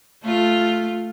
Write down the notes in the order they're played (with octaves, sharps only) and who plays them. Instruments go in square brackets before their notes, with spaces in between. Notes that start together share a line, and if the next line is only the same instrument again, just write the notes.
[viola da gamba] A3 F4